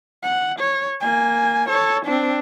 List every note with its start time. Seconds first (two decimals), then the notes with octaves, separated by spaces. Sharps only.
0.23 F#5
0.59 C#5
1.00 A#3 G#5
1.69 A4 C#5
2.05 C4 D4